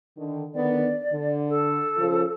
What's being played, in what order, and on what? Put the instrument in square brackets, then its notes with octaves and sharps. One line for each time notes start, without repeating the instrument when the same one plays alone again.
[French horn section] D3 D#3
[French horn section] D3 D#3 B3 [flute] D5
[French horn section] D3
[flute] A4
[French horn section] C#3 F3